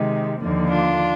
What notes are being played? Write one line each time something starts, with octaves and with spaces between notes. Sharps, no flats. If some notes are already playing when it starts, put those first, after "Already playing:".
Already playing: C3 D#3 G#3
D#2 D3 F3 A#3
D4 F4